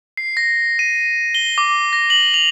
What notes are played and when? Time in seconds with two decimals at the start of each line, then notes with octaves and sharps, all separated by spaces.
0.17 C7
0.37 A#6
0.79 D#7
1.35 G7
1.58 D6
1.93 A#6
2.10 F#7
2.34 F7